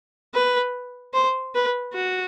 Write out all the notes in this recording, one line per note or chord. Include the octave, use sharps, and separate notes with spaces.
B4
C5
B4
F#4